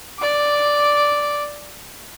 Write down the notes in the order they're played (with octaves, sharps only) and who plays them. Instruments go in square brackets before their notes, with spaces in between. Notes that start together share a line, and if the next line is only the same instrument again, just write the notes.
[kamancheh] D5 D6